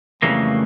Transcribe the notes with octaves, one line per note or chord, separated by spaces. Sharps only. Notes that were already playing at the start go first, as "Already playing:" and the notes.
F2 C#3 E3 G3 A3 A#3